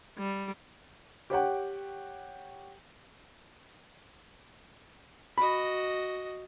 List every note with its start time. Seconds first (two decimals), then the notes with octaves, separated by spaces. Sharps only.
0.18 G3
1.30 G4 C#5 F#5 G5
5.38 F#4 D#5 B5